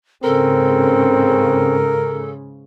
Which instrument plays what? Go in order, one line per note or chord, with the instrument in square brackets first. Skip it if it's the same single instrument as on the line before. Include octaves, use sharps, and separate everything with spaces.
[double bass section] G#2 C#3 [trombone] C4 [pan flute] A4 [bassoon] A#4